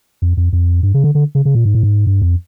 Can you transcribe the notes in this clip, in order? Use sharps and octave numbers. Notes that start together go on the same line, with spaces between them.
F2
F2
F2
G2
C#3
D3
D3
C#3
C#3
A#2
G#2
A2
G#2
G2
F2